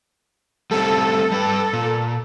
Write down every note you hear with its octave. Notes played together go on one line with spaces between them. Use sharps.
G3 A3 C4 A4
G3 B4
A#2